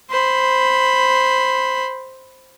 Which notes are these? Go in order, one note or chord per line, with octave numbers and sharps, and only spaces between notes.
C5 B5